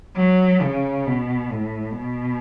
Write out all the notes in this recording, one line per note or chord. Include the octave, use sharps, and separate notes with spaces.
F#3
C#3
B2
A2
B2